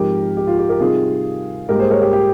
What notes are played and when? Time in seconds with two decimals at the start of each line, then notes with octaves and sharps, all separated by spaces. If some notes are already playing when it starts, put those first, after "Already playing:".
Already playing: G#2 F3 C4 D#4 G4 A#4
0.37 G4
0.47 F4
0.58 G4
0.69 G4 A#4
0.80 C3 G3 C4 D#4 F4 G#4
1.68 G#2 G3 A#3 G4 A#4
1.79 G#4 C5
1.90 A#4 C#5
2.02 G4 A#4
2.13 G4